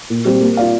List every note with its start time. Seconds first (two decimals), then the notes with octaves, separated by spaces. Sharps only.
0.10 A#2
0.25 G3 C4 G4 C5
0.41 A#3
0.57 F4 D5 F5